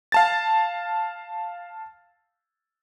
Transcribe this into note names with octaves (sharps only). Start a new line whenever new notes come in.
F5 A5 A6